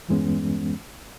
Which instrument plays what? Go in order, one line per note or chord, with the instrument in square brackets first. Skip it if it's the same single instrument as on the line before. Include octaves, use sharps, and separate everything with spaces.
[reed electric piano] E2 G2 E3 G#3 B3 C#4